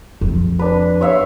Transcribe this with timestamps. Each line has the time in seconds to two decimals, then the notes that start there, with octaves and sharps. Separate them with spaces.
0.21 F2
0.59 D4 B4
1.01 C#5 E5 F5